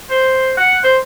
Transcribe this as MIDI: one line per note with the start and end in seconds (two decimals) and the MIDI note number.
0.10 0.52 72
0.57 0.79 78
0.84 0.98 72